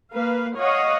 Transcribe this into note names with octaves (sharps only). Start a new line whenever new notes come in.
A#3 B4 F5
C#5 D#5 F5 F#5